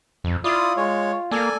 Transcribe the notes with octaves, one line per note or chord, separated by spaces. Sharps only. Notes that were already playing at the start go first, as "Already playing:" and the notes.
F2
E4 F4 D5 D#6
G#3 C#5
A#3 A4 D5 G#5